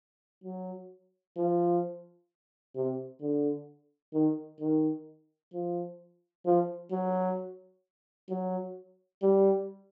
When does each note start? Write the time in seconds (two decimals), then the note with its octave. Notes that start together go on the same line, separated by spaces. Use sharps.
0.44 F#3
1.37 F3
2.75 C3
3.21 D3
4.14 D#3
4.60 D#3
5.53 F3
6.46 F3
6.91 F#3
8.30 F#3
9.22 G3